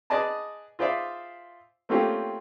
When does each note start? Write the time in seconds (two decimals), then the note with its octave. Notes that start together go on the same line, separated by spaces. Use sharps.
0.10 G#4 B4 D5 D#5 A5
0.79 F4 G#4 C5 D5 E5 F5
1.89 A3 A#3 C4 C#4 F4 G4